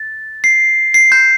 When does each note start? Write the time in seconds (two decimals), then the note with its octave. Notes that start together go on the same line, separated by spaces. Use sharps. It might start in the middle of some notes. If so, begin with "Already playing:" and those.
Already playing: A6
0.44 C7
0.94 C7
1.12 G6